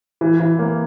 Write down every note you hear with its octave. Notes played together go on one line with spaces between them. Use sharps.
E3
E3
A#3